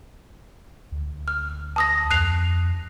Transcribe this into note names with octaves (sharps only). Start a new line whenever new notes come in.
D2
F6
A5 D#6 A#6
F2 F#6 C7 F7